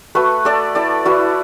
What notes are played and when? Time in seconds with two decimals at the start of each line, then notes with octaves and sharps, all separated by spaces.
0.15 A3 F#4 B4
0.45 A3 A4 D5
0.75 E4 A4 D5
1.05 E4 F#4 B4